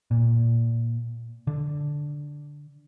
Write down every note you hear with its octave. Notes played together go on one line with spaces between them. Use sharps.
A#2
D3